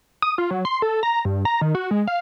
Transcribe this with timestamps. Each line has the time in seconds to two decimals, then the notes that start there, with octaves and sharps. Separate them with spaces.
0.22 D#6
0.38 F4
0.51 F#3
0.65 C6
0.82 A4
1.03 A#5
1.25 G2
1.45 A#5
1.61 D#3
1.75 F#4
1.91 G#3
2.07 F5